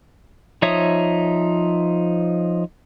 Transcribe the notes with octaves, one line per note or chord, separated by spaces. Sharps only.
F3 D#4 C#5 E5 D#6